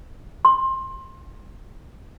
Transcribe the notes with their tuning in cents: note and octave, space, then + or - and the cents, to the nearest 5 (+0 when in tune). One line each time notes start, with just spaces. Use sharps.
C6 +25